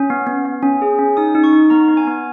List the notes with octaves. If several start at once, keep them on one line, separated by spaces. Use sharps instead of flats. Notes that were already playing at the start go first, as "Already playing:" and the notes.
Already playing: C#4
B3
B3
B3
C#4
G#4
C#4
D#4 D#6
D#4
C#6
D#4
B3 A#5
B3
G#5
B3